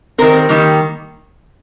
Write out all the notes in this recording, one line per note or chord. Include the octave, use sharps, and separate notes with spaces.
D#3 G3 C4 A#4
D#3 G3 A#3